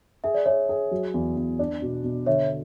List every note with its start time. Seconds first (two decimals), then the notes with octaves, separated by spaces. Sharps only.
0.24 G#4 E5
0.34 D5
0.46 G#4 C#5 E5
0.69 G#4
0.91 F#3
1.14 E2
1.37 E2
1.59 D4
1.82 B2
2.04 B2
2.26 D3 C#5 E5